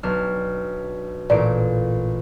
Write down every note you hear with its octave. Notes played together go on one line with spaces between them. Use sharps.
B1 D4 F6
A1 A#2 D5 D7